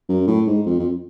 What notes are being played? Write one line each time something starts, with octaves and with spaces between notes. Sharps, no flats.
F#2
A2
G#2
F2
F2